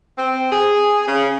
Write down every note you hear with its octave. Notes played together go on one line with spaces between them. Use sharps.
C4
G#4
C#3